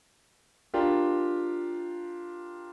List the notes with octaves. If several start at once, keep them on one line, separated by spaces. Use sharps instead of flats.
D4 F4 G4 A#4